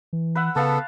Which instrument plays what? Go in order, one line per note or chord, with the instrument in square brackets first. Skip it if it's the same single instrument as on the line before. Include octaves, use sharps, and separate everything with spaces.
[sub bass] E3
[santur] B4 E5 F#5
[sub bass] C#3 [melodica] B3 A4 [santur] F5 A5 C#6